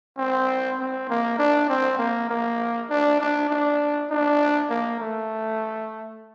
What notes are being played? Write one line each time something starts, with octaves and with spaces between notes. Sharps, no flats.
C4
C4
A#3
D4
C4
A#3
A#3
D4
D4
D4
D4
A#3
A3